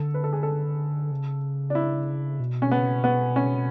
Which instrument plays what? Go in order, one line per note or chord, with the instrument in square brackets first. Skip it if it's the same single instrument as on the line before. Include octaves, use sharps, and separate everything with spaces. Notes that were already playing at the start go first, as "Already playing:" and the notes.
Already playing: [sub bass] D3 [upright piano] A4
[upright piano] B4
A4
G#4
A4
[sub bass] C#3
[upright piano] D4
E4
[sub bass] B2
[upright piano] C#4
B3
B3
C#4